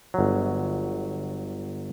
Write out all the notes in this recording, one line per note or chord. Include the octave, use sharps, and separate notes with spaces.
G1 F#3